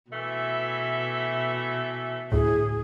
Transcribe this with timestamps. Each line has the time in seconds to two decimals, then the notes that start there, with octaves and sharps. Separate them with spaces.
0.11 B2 E3 A3 E5
2.32 D2 A2 G#4